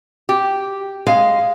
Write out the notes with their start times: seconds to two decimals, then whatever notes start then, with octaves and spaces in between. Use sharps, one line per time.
0.29 G4
1.07 G#3 F5